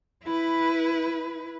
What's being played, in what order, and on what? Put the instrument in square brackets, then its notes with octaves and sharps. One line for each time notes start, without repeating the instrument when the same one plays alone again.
[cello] E4 B4